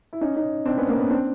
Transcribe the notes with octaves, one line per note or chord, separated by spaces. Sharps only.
E4
C#4 D#4
C#4 D#4
C4 D4
B3 C#4
A#3 C4
B3 C#4
C4 D4